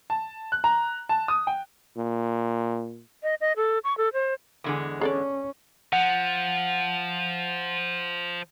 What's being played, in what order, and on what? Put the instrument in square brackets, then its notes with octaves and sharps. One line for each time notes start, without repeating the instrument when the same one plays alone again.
[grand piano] A5
F#6
A#5
A5
D#6
G5
[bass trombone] A#2
[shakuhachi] D#5
D#5
A4
C#6
A4
C5
[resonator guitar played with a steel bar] E2 D3 G#3
[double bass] C#4 [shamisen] G#4 A4 D5
[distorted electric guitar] F3 [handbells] F#5